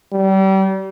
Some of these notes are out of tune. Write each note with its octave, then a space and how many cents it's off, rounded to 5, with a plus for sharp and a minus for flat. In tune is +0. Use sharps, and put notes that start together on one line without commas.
G3 -30